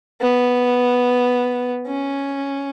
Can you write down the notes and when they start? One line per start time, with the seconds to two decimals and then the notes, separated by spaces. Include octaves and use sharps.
0.21 B3
1.87 C#4